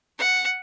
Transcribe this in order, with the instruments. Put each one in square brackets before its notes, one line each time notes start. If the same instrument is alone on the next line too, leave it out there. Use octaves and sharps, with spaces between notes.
[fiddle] F#5